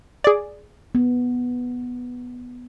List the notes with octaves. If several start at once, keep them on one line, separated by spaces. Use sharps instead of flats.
G#4 D5
B3